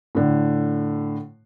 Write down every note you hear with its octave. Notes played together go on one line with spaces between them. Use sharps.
A2 D3